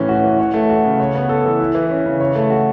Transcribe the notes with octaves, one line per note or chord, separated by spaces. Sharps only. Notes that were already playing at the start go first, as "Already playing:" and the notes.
Already playing: A2 E3 C#4
F#4
E3
C#5
A3
F#4
C#3
C#5
B3
A4
E3
E4
E3
C#4
C#3
C#5
A3
F#4